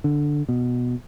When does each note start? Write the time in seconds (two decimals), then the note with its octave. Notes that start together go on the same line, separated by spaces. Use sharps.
0.04 D3
0.49 B2